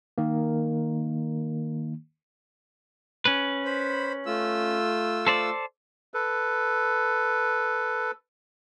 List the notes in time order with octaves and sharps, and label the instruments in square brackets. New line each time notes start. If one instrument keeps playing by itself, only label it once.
[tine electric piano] D#3 A#3
[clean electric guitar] C#4 B4
[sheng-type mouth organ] C5 B5
A3 F4 E6
[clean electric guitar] A4 C5 D5
[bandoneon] A4 B4